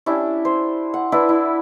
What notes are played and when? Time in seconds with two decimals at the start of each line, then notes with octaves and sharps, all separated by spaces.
0.06 C#4 D4 E4 G4
0.45 C5
0.94 F#5
1.12 D4 E4 B4
1.29 E4